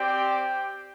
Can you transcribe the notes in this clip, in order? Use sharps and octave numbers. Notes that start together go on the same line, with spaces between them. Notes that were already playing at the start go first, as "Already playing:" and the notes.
Already playing: C4 G4 D5 G5